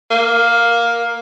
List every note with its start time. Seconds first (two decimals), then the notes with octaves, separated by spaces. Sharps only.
0.11 A#3